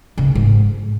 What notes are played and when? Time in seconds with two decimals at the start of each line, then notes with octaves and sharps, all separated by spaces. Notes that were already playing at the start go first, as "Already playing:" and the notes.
0.18 C#3
0.35 G#2